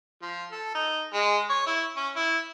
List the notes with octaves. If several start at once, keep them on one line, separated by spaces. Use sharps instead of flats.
F3
A4
D#4
G#3
C#5
E4
C#4
E4